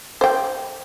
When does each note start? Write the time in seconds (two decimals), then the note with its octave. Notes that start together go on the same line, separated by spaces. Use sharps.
0.21 C5 G5